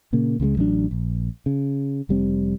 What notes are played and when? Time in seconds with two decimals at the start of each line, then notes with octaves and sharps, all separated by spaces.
0.13 A#2 C#3 A#3
0.40 C#2 C#3 G3 G#3
0.57 A1 F#3 G3 D4
0.91 A#1
1.46 C#3
2.09 F1 G3 C4